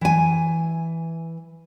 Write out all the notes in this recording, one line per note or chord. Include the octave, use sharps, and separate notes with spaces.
E3 G#5